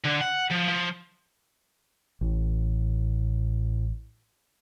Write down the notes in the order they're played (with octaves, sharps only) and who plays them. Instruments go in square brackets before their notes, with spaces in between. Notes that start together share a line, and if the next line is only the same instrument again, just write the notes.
[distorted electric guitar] D3
F#5
F3
F3
[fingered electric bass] A1 [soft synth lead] A2